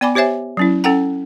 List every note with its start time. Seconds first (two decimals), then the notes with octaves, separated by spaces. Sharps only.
0.01 B3 D5 G#5 B5 D6
0.15 G4 C5 C#5 E5 G#5
0.57 F#3 C#4 E4
0.84 C#4 A4 F#5 G5 A#5